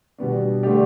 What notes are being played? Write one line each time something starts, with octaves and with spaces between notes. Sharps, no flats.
B2 G3 B3 D4
D3 A3 D4 G4 D5